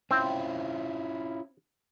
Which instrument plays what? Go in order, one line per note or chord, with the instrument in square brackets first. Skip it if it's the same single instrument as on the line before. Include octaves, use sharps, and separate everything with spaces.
[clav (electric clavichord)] C4 [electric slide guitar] C#4 E4 F4